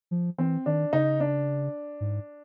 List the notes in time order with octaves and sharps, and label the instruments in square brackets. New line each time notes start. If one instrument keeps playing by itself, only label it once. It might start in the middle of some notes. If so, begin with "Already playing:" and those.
[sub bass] F3
[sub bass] E3 [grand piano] C4
[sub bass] D#3 [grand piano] D4
[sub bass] C#3 [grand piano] D#4
[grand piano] D4
[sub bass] G#2